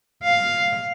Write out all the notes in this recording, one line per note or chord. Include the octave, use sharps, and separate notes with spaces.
F5